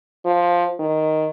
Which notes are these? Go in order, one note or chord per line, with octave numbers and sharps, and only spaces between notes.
F3
D#3